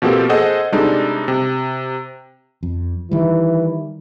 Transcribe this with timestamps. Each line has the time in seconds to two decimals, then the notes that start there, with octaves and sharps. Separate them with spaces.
0.02 B2 F3 A#3 C4 G4 A4
0.29 G#4 A4 C5 D#5 F#5
0.72 C3 G3 G#3 D4 D#4 A4
1.28 C3
2.63 F2
3.11 D#3 E3 G3